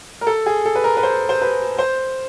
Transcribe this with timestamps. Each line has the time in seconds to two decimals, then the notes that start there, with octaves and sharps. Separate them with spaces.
0.21 A#4
0.27 A4
0.46 G#4
0.66 A4
0.75 B4
0.84 A#4
0.97 B4
1.03 C5
1.29 C5
1.42 B4
1.79 C5